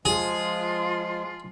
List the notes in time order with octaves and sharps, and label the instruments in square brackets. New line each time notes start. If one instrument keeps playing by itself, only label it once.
[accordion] F3 G#3 [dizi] F4 [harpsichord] G#4